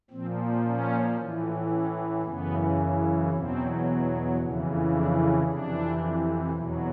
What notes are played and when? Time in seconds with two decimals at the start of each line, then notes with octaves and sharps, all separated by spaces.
0.10 A#2 F3 C4
0.64 C#4
1.18 A2 E3
1.71 C#4
2.23 F#2 C#3 E3 B3
3.30 E2 B2 F#3 C4
4.37 F2 C#3 E3
4.91 D4
5.43 F2 C3 E3 D4
6.50 E2 B2 F#3